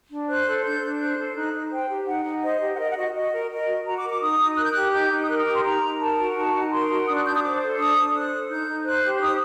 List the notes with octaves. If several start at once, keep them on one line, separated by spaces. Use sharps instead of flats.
D4
C5 F#6
A4
D4 G6
D4
C5 F#6
A4
D#4 F#6
D#4
C5 G5
G4
D#4 F#5
D#4
C5 D#5
G4
F#5
A#4 D#5
F#5
F#4 D#5
F#4 D#5
A#4
A#4 D#5
F#4
F#4 A#5
D6
A#4
D6
D#4 D#6
D#4
A#4 F#6
G6
G4 F#6
D#4 G6
D#4
D#6
A#4 F#6
D#6
G4 D6
C6
D#4 A#5
D#4
A#4 A5
F#4
D#4 A5
D#4
A#4 C6
F#4
D4 D#6
F#6
D4 G6
D#6
C5 D6
A4
D4 D#6
D4
C5 F#6
A4
D#4 G6
D#4
C5 F#6
G4
D#4 D#6